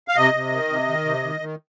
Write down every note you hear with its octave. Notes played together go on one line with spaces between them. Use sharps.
F5
C3 D#5
C3
D#3
C3
D#3
C3
D#3
D#3